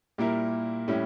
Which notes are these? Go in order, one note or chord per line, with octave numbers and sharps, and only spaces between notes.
A#2 G3 A#3 E4 A#4
A2 G3 C#4 E4